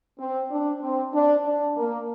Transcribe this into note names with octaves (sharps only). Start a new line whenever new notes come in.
C4
D4
C4
D4
D4
A#3